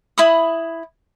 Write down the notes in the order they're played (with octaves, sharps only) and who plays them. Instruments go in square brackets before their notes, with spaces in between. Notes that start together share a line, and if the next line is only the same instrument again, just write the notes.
[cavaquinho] E4 B5 D#6